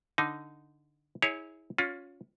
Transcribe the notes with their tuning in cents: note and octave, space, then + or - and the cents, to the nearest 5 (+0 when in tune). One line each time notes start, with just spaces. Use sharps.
D3 +0 D#4 +0
E4 -30 G#4 +0 C#5 +0
C#4 +20 F4 +25